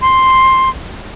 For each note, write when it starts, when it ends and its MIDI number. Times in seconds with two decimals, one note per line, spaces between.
0.02 0.69 84